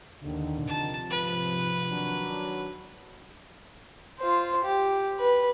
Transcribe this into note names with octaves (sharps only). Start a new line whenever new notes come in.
D#2 D3 D#3
C3 F3 A5
G#2 B4
D#3 F#3 D4
F4 C5
G4
B4